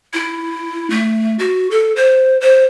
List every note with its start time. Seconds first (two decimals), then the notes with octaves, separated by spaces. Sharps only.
0.14 E4
0.90 A3
1.39 F#4
1.71 A4
1.96 C5
2.41 C5